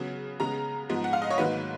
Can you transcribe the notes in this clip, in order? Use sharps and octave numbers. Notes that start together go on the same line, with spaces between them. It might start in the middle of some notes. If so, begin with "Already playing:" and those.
Already playing: C#3 F#3 B3
C#3 G#3 B3 A#5
G#2 F3 B3
F#5
F5
D#5
C#5
G#2 D#3 F#3 A#3 B4